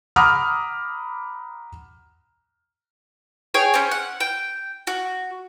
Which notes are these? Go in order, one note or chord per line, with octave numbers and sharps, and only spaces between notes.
F#5 A#5 B5 D6 D#6 F6
G#4 C#5 G5 G#5
C4 C#4
F#5
G5
F#4